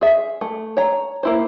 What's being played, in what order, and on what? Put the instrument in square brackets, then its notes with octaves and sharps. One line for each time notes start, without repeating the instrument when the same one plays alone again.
[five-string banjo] G#4 E5
A3
C#5 A#5
A#3 E4 C5